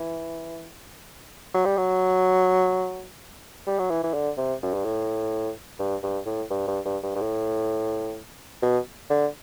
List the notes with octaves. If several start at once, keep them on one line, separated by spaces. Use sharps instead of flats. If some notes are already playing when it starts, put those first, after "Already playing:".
Already playing: E3
F#3
G3
F#3
G3
F#3
E3
E3
D3
C3
F#2
G2
A2
G2
G2
A2
G2
G2
G2
G2
G2
A2
B2
D3